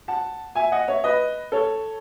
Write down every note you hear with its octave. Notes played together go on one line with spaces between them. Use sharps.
F#5 A5
E5 G#5
D#5 F#5
C#5 E5
B4 D#5
A4 C#5